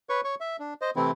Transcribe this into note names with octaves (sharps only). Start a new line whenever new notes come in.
B4 C#5 C#6
C#5 C#6
E5
D4
C5 D#5
C3 E3 A3 C4 E4